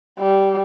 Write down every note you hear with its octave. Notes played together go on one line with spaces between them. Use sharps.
G3